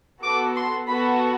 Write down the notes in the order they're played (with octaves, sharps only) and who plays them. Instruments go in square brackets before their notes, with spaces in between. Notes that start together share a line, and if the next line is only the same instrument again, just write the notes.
[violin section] B3 F#4 A4 D6
C6
B3 F#4 A4 B5